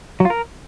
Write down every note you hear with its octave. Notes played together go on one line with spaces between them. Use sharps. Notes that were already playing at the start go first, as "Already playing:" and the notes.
F#3
F4
A#4